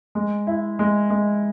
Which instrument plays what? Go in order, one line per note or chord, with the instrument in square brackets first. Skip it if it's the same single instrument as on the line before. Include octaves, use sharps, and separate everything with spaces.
[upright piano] G#3
E4
G#3
G#3